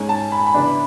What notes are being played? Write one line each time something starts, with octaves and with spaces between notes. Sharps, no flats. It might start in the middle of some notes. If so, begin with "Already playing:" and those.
Already playing: G#2 G#3 C#4 G#5
A5
B5
B5
C#3 E3 B3 D4